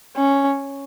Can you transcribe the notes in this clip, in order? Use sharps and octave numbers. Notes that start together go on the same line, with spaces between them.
C#4